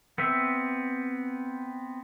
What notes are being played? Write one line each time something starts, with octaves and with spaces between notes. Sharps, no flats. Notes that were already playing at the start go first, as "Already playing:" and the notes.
B3 C4 E5